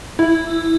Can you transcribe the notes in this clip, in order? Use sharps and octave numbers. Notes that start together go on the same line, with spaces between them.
E4